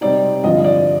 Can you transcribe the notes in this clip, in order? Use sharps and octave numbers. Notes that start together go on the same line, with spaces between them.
C3 G3 C4 D#4 D5
G2 D3 F3 D#5
D5